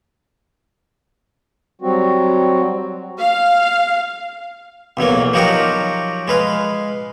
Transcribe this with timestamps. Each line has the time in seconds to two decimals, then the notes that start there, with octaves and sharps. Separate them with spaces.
1.82 F#3 G3 C4 F#4
3.18 F5
4.97 B1 E2 F#3 A#3
5.34 F3 F#3 D#4 F#4 G4 A#4
6.28 G#3 B4 F5